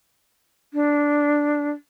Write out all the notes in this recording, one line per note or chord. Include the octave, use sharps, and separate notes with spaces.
D4